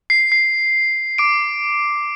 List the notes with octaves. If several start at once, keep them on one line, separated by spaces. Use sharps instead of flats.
C7
C7
D6 D7